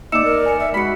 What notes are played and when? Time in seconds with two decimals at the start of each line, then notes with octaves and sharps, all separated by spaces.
0.12 A#3 D#4 D5 D6 E6 C#7 E7
0.25 A#4
0.46 G#5 C#7
0.59 E5
0.74 G#3 F#4 B5 B6 C#7